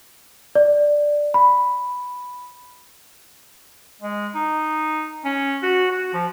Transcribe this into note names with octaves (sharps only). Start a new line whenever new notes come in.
D5
B5
G#3
D#4
C#4
F#4
F#4
F3